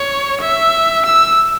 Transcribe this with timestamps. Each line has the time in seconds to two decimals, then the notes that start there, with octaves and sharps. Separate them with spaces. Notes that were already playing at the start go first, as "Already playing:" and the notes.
Already playing: C#5
0.42 E5
1.06 E6